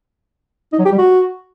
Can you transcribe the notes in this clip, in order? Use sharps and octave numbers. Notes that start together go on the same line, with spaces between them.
D#4
F#3
G4
G3
F#4